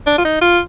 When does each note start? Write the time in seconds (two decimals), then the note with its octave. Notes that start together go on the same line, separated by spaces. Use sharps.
0.07 D4
0.18 F4
0.25 D#4
0.41 F4